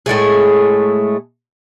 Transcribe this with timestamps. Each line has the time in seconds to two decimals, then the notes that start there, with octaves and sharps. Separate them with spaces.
0.06 A2 G#3 A3 G#4